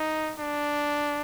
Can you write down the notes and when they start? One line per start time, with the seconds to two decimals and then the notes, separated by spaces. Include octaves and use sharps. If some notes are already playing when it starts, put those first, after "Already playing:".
Already playing: D#4
0.39 D4